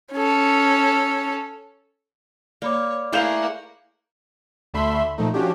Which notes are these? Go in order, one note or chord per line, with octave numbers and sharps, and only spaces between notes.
C#4 A4
A#3 C#5 D5 B5 D6
A3 A#3 E4 G#4 F5 F#5 G6 F7
D2 D3 A3 E5 B5 C6
A#2 F3 A3 D#4
F3 C#4 D4 F#4 G4